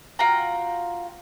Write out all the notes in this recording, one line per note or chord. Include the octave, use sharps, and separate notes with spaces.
F4 F#4 G5 A#5